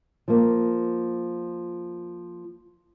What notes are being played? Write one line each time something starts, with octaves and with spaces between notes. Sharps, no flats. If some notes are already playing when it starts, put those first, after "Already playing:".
F3 A#3